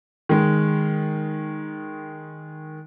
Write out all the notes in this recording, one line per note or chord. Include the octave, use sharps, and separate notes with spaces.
D#3 G#3